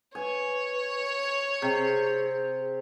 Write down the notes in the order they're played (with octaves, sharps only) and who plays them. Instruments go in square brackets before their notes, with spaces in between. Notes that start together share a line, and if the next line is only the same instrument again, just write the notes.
[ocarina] B4 [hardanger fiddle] C#5 [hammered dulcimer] G#5
[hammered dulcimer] C3 [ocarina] G#4